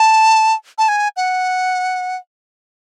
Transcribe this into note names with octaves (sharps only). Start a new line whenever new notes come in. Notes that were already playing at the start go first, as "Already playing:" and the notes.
Already playing: A5
A5
G#5
F#5